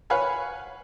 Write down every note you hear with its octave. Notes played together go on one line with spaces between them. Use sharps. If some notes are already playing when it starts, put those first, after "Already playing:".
B4 C#5 F5 F#5 G#5 B5